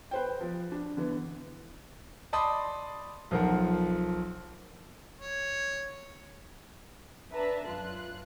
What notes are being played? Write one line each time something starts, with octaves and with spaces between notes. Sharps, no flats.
B4 C5 G5
F3
D4
D3 E3 B3
D5 D#5 A5 B5 C6 D#6
B1 F3 F4 A#4 F#5
C#5
D4 B4 E5 A5 A#5
F#2 F4 F#6